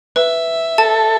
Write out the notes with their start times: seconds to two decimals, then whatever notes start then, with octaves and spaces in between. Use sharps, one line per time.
0.16 B4 E5
0.78 A4 A5